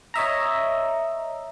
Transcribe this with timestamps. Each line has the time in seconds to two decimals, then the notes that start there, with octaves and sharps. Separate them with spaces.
0.14 C#5 D#5 E5 A#5